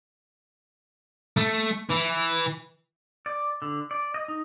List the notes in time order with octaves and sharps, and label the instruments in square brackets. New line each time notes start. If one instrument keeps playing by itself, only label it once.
[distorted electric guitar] A3
E3
[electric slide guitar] D5
D3
D5
D#5
D#4